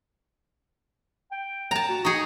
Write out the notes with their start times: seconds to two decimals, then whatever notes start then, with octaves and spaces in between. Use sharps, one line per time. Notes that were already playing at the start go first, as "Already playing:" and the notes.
1.32 G5
1.71 A5 A#5
1.89 F#4
2.05 D#4 G#4 C#6